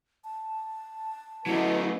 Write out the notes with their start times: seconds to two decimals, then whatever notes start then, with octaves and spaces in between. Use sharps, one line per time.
0.24 A5
1.46 F#3 A3 B3 C#4 E4 D#5